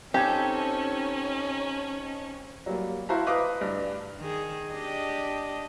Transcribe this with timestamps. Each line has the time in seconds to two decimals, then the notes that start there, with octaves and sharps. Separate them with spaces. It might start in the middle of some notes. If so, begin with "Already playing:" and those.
0.14 C4 C#4 D#4 G4 A4 G#5 G#6
2.66 F#3 G3 A#3
3.09 E4 F#4 C5 F5 A5 A#5
3.27 B4 D#5 F5 D6 D#6
3.61 G2
4.19 D#3 G#4
4.71 D4 G4 D#5